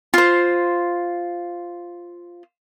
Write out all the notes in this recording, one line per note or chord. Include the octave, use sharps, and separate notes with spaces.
F4 C5